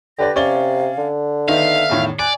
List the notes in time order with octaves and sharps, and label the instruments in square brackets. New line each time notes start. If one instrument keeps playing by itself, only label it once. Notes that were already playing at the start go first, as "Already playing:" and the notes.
[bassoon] D3 [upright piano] G4 B4 D5 [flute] A#6
[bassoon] C3 [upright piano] C#4 D5 G7 [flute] F5
[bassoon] D3
[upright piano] D#3 B3 D#4 [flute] E5 [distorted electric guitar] F5
[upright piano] E2 A2 D#3
[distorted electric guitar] D5 [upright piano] G#5 [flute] F#6